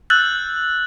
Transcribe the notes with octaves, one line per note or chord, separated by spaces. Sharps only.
E6 F#6 G6 A6 F#7